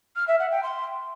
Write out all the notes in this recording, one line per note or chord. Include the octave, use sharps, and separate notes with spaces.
F6
E5
F#5
G5
C6